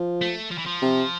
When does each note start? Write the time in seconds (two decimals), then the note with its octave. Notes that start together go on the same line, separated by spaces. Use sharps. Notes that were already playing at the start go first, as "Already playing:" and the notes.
Already playing: F3
0.21 A3
0.51 F3
0.58 E3
0.66 F3
0.82 C3